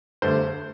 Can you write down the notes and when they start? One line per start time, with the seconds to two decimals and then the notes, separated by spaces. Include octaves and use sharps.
0.22 G2 D3 A3 C5